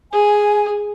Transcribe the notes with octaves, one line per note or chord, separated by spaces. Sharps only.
G#4 G#5